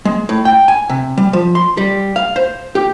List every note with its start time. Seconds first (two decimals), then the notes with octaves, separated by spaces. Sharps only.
0.05 G#3
0.29 A2
0.45 G5
0.68 G#5
0.89 C3
1.18 G3
1.33 F3
1.55 C6
1.77 G3
2.16 F5
2.36 C5
2.75 G4